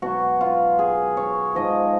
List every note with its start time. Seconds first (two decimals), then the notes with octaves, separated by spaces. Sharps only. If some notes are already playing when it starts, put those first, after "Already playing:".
0.02 B2 F#3 F#4
0.41 F4
0.79 G#4
1.17 C#5
1.55 G#2 F3 D#5